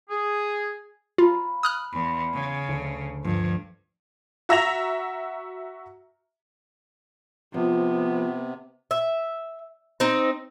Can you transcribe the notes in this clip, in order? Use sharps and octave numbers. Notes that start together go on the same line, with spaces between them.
G#4
F4 F5 A#5 B5
D#6 F6 F#6
E2 B5 C6
C#3 A#5
D2 C#6
G2 F3
F#4 E5 A#5 A#6 F7
C3 F3 B3
E5
C4 D#4